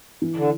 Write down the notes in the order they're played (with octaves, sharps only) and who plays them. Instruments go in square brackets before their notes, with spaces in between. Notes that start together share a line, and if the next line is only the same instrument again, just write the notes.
[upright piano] E3
[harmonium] D3